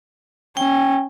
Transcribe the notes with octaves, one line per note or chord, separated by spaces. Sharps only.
C#4 G5